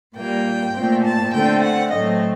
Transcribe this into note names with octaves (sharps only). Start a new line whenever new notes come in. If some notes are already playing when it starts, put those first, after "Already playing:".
A#2 G3 A#3 G5
A#2 A3 C4
A5
D3 A3 C4 G5
F#5
A2 F#3 A3 C4 D#5